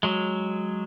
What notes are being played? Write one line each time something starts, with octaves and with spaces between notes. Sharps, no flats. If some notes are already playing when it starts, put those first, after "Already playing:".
F#3 G#3